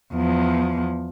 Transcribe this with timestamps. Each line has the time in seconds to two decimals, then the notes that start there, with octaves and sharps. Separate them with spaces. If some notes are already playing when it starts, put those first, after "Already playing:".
0.14 E2 F3